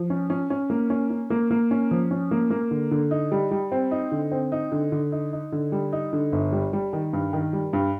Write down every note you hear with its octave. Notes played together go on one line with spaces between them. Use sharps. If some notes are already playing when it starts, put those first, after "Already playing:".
Already playing: F3
C#4
C#4
C#4
A#3
C#4
C#4
A#3
A#3
C#4
F3
C#4
A#3
A#3
D3
D3
D#4
G3
G3
C4
D#4
D3
C4
D#4
D3
D3
D#4
D#4
D3
G3
D#4
D3
G1
G3
G3
D#3
G2
D#3
G3
G2